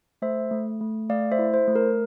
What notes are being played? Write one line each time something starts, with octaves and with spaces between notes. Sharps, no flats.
A3 C5 E5
A3
A3
A3 D5 F5
C5 E5
E4
C5
A3
A#4